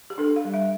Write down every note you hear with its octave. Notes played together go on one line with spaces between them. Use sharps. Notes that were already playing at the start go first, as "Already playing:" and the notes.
G4
D4 A4
F5
G3
E5